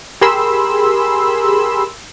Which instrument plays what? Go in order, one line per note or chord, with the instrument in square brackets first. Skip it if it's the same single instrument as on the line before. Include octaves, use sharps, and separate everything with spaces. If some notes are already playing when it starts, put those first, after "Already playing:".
[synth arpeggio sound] G4 G#4 A#4 B5 C6 E6